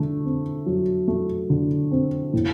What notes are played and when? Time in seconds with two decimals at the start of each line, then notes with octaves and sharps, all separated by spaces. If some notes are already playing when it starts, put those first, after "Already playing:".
Already playing: D3 A3
0.25 C4
0.66 F#3
1.08 A3
1.50 D3
1.91 C4
2.33 A2